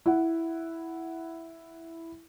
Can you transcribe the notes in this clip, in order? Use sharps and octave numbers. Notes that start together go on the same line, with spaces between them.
E4 F#5